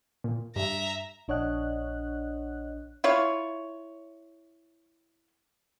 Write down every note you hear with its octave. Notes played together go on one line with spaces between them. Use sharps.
A#2
G2 E5 A#5
A#1 D4 C#5 D#5 F#5 F#6
E4 F4 C#5